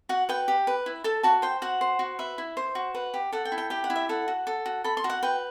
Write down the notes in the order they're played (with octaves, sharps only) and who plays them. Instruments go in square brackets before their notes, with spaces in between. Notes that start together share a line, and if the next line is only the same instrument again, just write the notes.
[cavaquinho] F#4 F#5
B4 G5
G4
B4
E4
A4 A5
F#4 A5
C5 G5
F#4 F#5
C5
F#4
B4 E5
E4
C5
F#4
B4 F#5
G4
A4 F#5
G5
E4
G5
G4 G5
F#5
E4
E5
A4 F#5
F#4
A4
F#4
A4 B5
C6
F#4
F#5
B4 G5